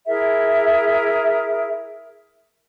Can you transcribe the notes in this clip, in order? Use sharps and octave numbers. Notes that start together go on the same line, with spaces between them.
E4 G#4 A#4 E5